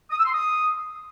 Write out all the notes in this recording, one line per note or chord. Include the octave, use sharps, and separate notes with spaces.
D#6
E6
C6
D#6